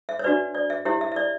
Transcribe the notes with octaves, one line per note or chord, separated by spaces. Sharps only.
E5
C#5
D4 F#4 B4 D5
D5
E5
E4 G4 C#5 E5
E5
E5
D5